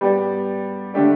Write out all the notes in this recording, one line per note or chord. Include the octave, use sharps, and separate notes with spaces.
G3 B3 G4 D5
D3 A3 D4 G4 D5